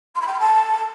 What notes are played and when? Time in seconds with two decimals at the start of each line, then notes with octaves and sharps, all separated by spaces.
0.15 C6
0.21 B5
0.27 G5
0.33 C6
0.39 A5